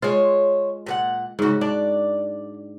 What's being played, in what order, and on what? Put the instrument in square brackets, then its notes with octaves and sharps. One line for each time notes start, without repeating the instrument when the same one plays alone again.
[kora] G#3 F4 [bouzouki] C5 C#5
[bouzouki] A#2 G4 F#5
[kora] G#2 F#4 [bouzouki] C#3 C#4
[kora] D4 [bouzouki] D5